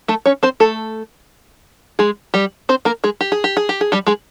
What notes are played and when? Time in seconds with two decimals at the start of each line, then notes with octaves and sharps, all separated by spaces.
0.08 A3 A4
0.26 C#4 C#5
0.43 C4 C5
0.60 A3 A4
1.99 G#3 G#4
2.34 G3 G4
2.69 C4 C5
2.85 A#3 A#4
3.04 G#3 G#4
3.21 G4
3.32 G#4
3.44 G4
3.57 G#4
3.69 G4
3.81 G#4
3.92 G3 G4
4.07 G#3 G#4